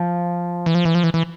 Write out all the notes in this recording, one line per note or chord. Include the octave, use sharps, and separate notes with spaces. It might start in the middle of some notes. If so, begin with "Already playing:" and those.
Already playing: F3
E3
F3
E3
F3
E3
E3